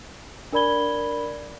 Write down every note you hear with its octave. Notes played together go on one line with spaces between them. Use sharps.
D4 A#4 D5 B5 G#6 G7